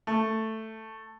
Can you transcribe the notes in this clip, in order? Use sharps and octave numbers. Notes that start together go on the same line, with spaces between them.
A3